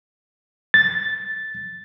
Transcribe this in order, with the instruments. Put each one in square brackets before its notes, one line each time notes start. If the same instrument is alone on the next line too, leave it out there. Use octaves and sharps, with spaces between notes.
[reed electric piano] A6